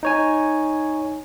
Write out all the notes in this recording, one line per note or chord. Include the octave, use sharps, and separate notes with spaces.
D#4 C#5 G#5